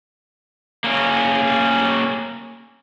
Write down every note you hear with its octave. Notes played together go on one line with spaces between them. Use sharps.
A#3 C#4